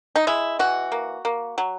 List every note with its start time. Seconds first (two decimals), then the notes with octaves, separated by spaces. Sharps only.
0.16 D#4
0.27 G#3 E4
0.59 E3 F#4
0.92 A#3
1.25 A#3
1.58 F#3